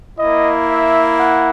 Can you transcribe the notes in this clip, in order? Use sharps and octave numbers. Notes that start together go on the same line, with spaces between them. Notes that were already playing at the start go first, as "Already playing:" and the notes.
A#3 E4 D#5
E5
F#5